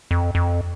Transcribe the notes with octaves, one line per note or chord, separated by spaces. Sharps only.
F2
F2